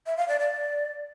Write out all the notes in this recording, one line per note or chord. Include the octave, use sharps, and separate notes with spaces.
E5
F5
D5
D5